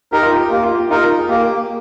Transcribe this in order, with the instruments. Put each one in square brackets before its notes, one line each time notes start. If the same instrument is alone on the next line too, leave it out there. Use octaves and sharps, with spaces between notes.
[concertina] D#4 A#4 [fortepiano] G4
[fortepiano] F4
G4
[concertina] A#3 [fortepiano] G4
[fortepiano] F4
G4
[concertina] D#4 A#4 [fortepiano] F4
[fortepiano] G#4
[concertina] A#3 [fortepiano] G4